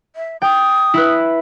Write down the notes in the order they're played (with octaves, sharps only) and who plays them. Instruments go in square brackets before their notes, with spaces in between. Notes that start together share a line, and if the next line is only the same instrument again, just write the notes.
[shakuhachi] E5
[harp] G5 [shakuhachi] D#6
[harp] E4 B4